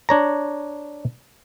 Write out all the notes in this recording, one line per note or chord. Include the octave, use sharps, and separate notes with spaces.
D4 C#5 A#5